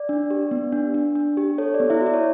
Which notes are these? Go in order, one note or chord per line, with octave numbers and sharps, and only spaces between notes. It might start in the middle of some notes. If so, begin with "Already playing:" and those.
Already playing: D5
D4
G4
B3
D4
D4
D4
G4
A4 C#5
D5
B3
E4 E5
F#4
D5
C#5